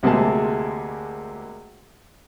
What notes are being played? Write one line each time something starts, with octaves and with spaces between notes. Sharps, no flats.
D2 C3 G#3 A#3 G#4 A5